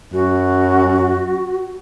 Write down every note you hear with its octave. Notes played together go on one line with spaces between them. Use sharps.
F#2 F#4